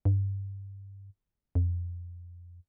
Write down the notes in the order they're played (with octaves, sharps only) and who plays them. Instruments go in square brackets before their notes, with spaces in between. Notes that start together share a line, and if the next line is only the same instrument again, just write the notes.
[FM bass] G2
F2